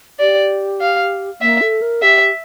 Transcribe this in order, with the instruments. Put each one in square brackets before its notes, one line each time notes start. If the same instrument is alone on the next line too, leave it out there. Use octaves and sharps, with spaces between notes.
[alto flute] G4 [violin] D5
[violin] F5
[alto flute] A#3 [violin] E5
[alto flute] A4
A#4
[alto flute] G4 [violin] E5